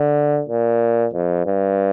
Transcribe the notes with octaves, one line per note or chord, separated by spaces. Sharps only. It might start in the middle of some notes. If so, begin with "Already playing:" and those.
Already playing: D3
A#2
F2
G2